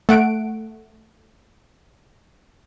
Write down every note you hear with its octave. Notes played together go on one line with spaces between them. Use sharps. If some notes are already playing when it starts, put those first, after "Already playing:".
A3 F#5 D7